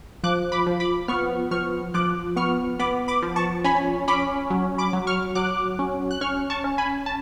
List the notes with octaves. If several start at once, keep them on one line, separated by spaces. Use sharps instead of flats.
F3 D6 F#6
B5 D6
F3
B5 D6
B3 C#6 F6
F3 C#6 F6
F3 D6 F#6
B3 C#6 F6
B3 B5 D6
B5 D6
F3
A5 C#6
C#4 G#5 B5
C#4 B5 D6
F#3
B5 D6
F#3
C#6 F6
F#3 D6 F#6
C#4
F#6
C#4 C#6 F6
A5 C#6
C#4
G#5 B5
A5